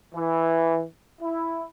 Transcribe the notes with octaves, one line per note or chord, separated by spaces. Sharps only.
E3
E4